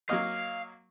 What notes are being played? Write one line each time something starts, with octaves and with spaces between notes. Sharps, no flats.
F#3 A#3 D#5 F5